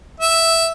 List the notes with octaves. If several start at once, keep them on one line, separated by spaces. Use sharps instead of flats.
E5